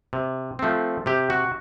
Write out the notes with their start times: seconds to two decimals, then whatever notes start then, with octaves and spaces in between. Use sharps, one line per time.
0.13 C3
0.59 F3 A3 C4
1.06 C3 G4
1.30 F#4